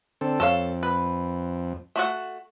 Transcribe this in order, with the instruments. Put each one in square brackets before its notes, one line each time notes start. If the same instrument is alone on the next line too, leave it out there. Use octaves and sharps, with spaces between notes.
[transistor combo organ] D3 C4 A4
[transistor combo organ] F2 [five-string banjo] A4 C#5 F5
[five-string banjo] B4
A3 F#4 F#5